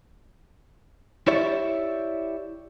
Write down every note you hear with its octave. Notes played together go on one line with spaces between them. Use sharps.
E4 G4 C#5 D5 E5